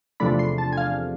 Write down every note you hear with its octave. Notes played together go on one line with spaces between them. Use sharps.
E2 C3 F3 A3 D4 B5
C6
A5
G#5
F5